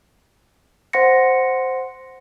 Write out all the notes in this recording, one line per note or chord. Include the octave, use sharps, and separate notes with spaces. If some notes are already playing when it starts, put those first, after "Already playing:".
C5 F#5 C6 A#6 C#7